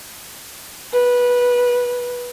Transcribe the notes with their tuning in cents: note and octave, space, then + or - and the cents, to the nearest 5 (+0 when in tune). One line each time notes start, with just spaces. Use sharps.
B4 -15